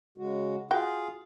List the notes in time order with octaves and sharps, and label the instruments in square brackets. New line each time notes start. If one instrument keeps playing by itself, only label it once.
[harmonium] C#3 G#3 F#4
[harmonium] F4 G#4 F5 [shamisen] F#4 G5